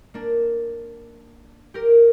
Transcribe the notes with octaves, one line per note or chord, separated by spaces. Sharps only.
A#3 D4
G4 A#4